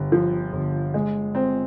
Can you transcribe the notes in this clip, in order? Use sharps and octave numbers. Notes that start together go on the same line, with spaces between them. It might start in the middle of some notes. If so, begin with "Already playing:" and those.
Already playing: G1
F3
G1
G#3
C4